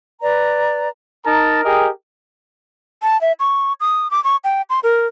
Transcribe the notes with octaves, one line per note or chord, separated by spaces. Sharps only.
B4 D5 A#5
D#4 A#4 A5 A#5
G4 G#4 A#4 D#5 G5
A5
E5
C#6
D#6
D6
C#6
G5
C6
A#4